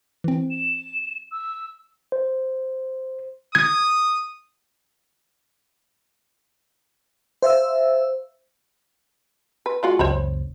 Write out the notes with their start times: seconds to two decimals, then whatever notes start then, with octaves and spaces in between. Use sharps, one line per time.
0.24 E3 C4
0.51 E7
1.31 E6
2.12 C5
3.55 D#6 G#6
7.42 C5 E5 F5 E6
9.66 B4
9.83 G#3 F4 F#4
9.99 F#1 C#2 C5 C#5 B5